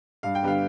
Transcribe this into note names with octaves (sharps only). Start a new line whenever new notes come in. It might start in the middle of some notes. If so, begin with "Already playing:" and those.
G2 F5
G5
D3 G3 B3 F5